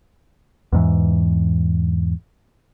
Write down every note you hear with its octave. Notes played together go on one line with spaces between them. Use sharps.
E2 G#2 E3